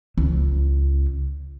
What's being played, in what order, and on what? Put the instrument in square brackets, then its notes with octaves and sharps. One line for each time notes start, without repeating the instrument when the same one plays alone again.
[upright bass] C#2